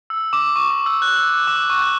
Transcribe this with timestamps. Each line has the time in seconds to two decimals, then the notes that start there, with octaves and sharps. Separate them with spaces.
0.10 E6
0.33 D6
0.56 C#6
0.71 D6
0.86 E6
1.02 F#6
1.16 E6
1.32 E6
1.47 D6
1.70 C#6
1.82 F#6